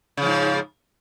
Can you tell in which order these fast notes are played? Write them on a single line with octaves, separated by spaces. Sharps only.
C#3 F3 G#2